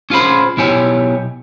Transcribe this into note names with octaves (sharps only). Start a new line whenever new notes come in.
C#4 F4 G#4 C5 B5
B1 B2 E4 G4 C#5 G#5